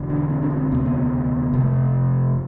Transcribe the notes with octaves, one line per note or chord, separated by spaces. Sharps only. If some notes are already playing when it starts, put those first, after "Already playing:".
Already playing: E1 E2 D3
D4
C4
D4
C4
E1 D2 C3 B3
C4
B3
F1 F2 C3 A3